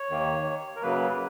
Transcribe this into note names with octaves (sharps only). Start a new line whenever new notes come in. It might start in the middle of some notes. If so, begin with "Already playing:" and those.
Already playing: C#5
D#2 D#3 A#3
A#4
F#2 C#3 F#3 A#3 B4